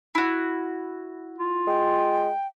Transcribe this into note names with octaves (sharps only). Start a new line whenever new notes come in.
E4 F#4
F4
G#3 G5